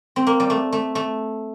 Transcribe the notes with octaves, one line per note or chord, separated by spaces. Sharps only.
C4
A#3
G3
A3
A3
A3